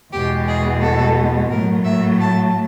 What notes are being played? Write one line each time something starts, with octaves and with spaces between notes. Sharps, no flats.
E2 B2 G#3 G4
G#4
A4
A2 F#3 A3 A#4
E5
A5